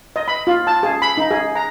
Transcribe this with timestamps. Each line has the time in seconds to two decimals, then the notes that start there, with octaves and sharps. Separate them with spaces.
0.16 D#5
0.28 B5
0.47 F4
0.67 A5
0.83 G#4
1.02 B5
1.17 D#4
1.31 G#4
1.55 A#5